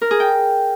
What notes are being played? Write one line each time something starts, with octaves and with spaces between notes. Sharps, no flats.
A#4
G#4
G5